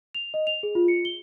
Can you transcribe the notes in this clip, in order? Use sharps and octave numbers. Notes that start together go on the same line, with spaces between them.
F7
D#5
F7
G#4
F4
C#7
G7